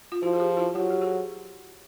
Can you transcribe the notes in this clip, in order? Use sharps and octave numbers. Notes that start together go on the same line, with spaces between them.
F4
F3 E4 F#4
G#4
F4 G4
E4 F#4
F#3 F4 G4
G4
F#4 G#4